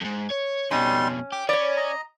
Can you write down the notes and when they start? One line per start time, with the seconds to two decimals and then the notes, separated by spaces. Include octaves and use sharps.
0.01 F2 G#2
0.30 C#5
0.71 F2 B2 G3 C#4 D#4 C6
1.32 G4 D6
1.49 C#4 C#5 D5 B5
1.77 D#5 A#5